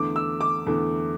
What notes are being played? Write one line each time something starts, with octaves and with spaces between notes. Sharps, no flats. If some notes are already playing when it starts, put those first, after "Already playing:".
Already playing: E2 D3 A3 D6
E6
D6
E2 D3 A3